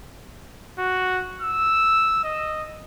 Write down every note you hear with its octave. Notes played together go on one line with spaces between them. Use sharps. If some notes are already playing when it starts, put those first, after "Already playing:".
F#4
E6
D#5